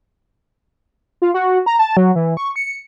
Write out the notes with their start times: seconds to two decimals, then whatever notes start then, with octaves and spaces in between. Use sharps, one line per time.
1.22 F4
1.34 F#4
1.66 A#5
1.79 A5
1.97 F#3
2.16 E3
2.37 C#6
2.56 C#7